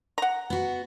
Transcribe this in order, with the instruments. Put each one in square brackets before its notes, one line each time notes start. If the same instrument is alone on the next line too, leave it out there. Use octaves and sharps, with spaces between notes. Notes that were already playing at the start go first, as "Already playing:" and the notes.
[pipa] F#5 A#5
[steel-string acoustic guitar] B3 F#4